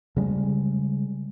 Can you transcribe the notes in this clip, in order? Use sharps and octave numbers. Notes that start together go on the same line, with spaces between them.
C#3 G3 G#3